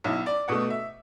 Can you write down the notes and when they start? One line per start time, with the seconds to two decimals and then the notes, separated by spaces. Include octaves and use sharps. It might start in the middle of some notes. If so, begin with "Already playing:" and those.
0.04 B1 E4
0.26 D5
0.48 B2 A3 F#5
0.70 E5